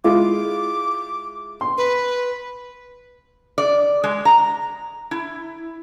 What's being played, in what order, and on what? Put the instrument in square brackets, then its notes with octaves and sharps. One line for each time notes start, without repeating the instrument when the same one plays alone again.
[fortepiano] G#3 E4 F4 [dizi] D6
[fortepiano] C6
[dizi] B4
[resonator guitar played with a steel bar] D5
G#3
A#5
E4